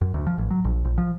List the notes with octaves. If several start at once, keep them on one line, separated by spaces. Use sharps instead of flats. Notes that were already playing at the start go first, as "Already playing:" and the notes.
F#2
D2
F3
A1
F#3
A#1
A#1
F3